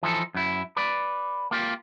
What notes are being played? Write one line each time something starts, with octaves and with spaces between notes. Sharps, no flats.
E3 F3 D#4 A4
F#2 E4
B4 D5
A#3 F4 G4